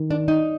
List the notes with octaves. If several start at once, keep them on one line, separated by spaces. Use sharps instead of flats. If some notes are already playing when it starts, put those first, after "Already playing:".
Already playing: D#3
D4
D#4